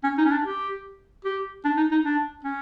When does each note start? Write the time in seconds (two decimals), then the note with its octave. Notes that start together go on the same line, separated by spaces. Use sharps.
0.04 C#4
0.18 D#4
0.26 C#4
0.31 D4
0.44 G4
1.25 G4
1.65 D4
1.77 D#4
1.92 D#4
2.05 D4
2.44 C#4